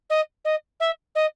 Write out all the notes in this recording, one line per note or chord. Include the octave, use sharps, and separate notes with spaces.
D#5
D#5
E5
D#5